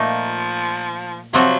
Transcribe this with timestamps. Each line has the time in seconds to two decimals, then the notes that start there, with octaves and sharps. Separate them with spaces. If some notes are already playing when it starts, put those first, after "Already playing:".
Already playing: A#2 F3 A3 D#4
1.33 C3 F3 F#3 C4 F#4 A4